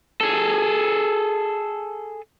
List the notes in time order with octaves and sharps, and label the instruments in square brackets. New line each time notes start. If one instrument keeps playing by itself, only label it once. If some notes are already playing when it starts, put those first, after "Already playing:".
[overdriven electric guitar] G#4 A4